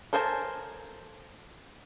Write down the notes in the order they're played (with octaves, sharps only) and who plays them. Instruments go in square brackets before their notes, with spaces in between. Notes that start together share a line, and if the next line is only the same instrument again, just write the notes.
[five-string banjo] A4 A#4 C5 G#5 A5